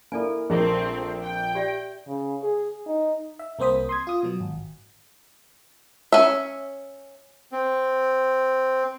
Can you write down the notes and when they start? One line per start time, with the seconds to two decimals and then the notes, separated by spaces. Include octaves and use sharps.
0.12 A#3 E4 A4 D5 G#5
0.50 A#1 A3 C4 G#4 A#4
1.23 G5
1.55 G4 D5 E5
2.08 C#3
2.43 G#4
2.87 D#4
3.39 E5
3.59 C2 A#3 C4 C5 D#6 B6
3.89 C6 D#6 G#6
4.07 F4 D#6
4.23 B2 F#3
4.40 G#1
6.12 C#4 E5
7.52 C4